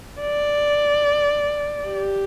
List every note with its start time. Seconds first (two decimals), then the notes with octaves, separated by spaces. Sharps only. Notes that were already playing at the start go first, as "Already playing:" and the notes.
0.21 D5
1.88 G4